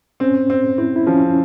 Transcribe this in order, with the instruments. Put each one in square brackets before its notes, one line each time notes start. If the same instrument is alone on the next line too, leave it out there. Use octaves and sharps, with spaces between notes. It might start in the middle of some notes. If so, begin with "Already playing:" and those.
[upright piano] C4 [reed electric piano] C#4
[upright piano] C4
[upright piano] C4 [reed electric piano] E4
[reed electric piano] E4
[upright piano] F3 [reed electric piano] C#4